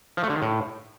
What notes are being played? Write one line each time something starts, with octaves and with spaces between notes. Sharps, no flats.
F3
A3
D3
D#3
A2